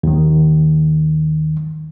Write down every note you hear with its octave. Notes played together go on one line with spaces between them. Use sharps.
D#2 D#3